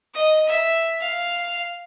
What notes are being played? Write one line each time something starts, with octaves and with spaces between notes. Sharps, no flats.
D#5
E5
F5